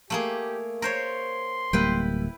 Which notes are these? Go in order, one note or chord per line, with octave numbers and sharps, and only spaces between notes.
A3 A#3 G4 G#4
A#4 C5 C#5 C6
D1 G3 A#3 E4 B4 G5